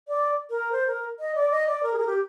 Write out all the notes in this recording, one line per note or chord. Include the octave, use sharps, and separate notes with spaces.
D5
A#4
C5
A#4
D#5
D5
D#5
D5
A#4
G#4
A#4
G4